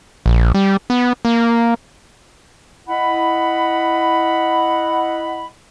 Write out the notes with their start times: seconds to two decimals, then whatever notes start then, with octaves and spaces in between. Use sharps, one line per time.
0.26 A#1
0.54 G3
0.90 B3
1.25 A#3
2.88 E4 D#5 F#5 B5